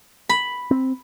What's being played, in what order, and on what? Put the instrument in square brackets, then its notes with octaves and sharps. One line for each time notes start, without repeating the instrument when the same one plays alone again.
[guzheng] B5
[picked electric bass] C4